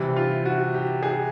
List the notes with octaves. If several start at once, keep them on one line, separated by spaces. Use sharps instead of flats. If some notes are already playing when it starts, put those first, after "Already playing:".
Already playing: C3 E3 G3
F4
F#4
G4
G#4